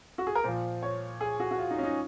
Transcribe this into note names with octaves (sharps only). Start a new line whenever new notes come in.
F#4
G#4
A#4
A#2 F3 C5
C#5
G#4
F#4
F#4
F4
D#4
C#4
D#4